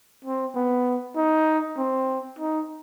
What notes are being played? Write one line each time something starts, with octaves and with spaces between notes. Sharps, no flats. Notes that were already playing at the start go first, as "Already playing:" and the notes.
C4
B3
D#4
C4
D#4